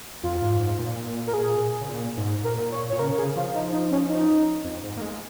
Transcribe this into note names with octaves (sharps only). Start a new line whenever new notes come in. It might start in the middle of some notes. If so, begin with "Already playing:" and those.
F2 F4
G#2
G#2
A#2
A#4
G#4
C#3
A#2
G#2
A#2 A#4
C#5
A#2 C#5
C#3 A#4
C#3 G#4
F3 F4
D#4
D#4
C#4
D#4
F2
G#2
A#3
G#3